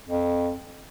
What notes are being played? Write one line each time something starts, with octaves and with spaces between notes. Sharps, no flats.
F2